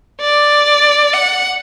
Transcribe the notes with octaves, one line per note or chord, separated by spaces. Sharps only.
D5
F#5